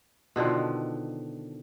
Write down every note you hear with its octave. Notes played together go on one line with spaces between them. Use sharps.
B2 D3 D#3 F3